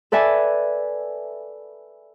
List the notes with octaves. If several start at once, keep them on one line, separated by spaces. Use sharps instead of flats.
A4 B4 D5 E5 G#5